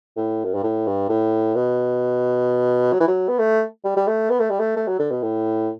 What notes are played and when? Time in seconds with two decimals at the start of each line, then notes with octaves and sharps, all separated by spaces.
0.17 A2
0.45 F#2
0.54 G2
0.63 A2
0.87 G2
1.09 A2
1.55 B2
2.92 F#3
3.00 E3
3.08 F#3
3.28 B3
3.39 A3
3.84 G3
3.97 G3
4.08 A3
4.30 B3
4.40 A3
4.50 G3
4.60 A3
4.76 A3
4.88 F#3
4.99 D3
5.11 B2
5.22 A2